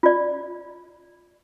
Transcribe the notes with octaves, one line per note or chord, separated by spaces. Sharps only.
F4 D5